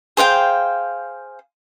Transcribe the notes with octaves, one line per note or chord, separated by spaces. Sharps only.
G#4 C5 F5 G5